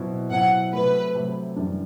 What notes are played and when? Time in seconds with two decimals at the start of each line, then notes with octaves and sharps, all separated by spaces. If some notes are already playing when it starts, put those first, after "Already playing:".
Already playing: B2 F#3 C4 E4
0.31 B2 F#3 C4 E4 F#5
0.73 C3 F#3 A3 B4
1.15 C3 F#3 A3
1.56 F#2 E3 G3 D4